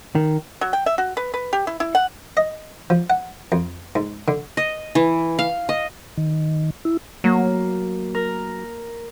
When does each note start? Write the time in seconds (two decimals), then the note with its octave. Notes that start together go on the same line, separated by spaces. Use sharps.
0.15 D#3
0.61 F#3
0.73 G5
0.86 E5
0.98 F#4
1.17 B4
1.34 B4
1.53 G4
1.67 E4
1.80 E4
1.95 F#5
2.37 D#5
2.90 F3
3.10 F#5
3.52 F2
3.95 G#2
4.28 D3
4.57 D#5
4.95 E3
5.39 F5
5.69 D#5
6.18 D#3
6.85 E4
7.24 F#3 A#3
8.15 A#4